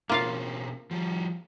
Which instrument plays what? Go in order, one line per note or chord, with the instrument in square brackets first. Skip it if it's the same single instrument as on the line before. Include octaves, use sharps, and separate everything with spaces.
[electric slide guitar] B2 C4 C#4 [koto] A#3 F4 F5
[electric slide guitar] F3 G3